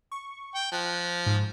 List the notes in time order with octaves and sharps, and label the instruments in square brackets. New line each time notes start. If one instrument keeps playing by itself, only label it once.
[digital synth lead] C#6
[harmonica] G5
[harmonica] F3 [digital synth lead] F#6
[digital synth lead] G#2